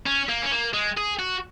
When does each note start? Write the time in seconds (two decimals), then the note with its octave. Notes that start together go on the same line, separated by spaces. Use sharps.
0.06 C#4
0.29 A#3
0.43 C#4
0.52 A#3
0.74 G#3
0.97 G#4
1.19 F#4